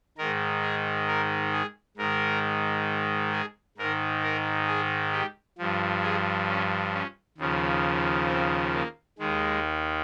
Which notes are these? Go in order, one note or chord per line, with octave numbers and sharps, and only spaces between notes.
G#2 D#3 A#4
G#4
A#4
G#4
G#2 D#3 A#4
G#4
G#2 D#3 A#4
A#4
G#4
G4
G2 F3
G#4
C#4
C#4
D#2 C#3 F3
C4
A#3
D#2 D#3 G#3